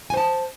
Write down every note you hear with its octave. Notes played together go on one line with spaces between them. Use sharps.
C5 G#5 A5